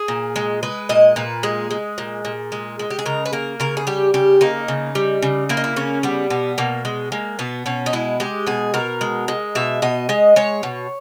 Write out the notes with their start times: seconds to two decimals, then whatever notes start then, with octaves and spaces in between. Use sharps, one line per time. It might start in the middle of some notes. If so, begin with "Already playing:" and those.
Already playing: G#4
0.08 A#2
0.36 G#3
0.63 G#3 B4
0.89 A#2 D#5
1.16 A#2 B4
1.43 G#3 G#4
1.71 G#3
1.98 A#2
2.25 A#2
2.52 G#3
2.79 G#3
2.90 G4
2.99 G#4
3.06 C#3 A#4
3.26 B4
3.33 A#3 A#4
3.60 C#3 A#4
3.77 G#4
3.87 G3 G4
4.14 C#3 G4
4.41 A#3 D#4
4.68 C#3
4.95 G3
5.22 C#3
5.49 A#3 E4
5.57 D#4
5.64 E4
5.76 C#3 C#4
6.03 G3 B3
6.30 B2 B3
6.58 B2 A#3
6.85 G#3
7.12 G#3 A#3
7.39 B2 B3
7.66 B2 C#4
7.86 D#4
7.93 G#3 E4
8.20 G#3 G4
8.47 B2 G#4
8.74 B2 A#4
9.01 G#3
9.28 G#3
9.55 B2 E5
9.82 B2 D#5
10.09 G#3 D#5
10.36 G#3 C#5
10.63 B2